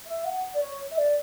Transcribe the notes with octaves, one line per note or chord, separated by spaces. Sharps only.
E5
F#5
D5
C#5
E5
D5